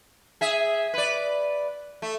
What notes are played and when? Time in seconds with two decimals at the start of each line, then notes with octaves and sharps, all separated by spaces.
0.41 G#4 E5
0.94 B4 D5
2.02 A3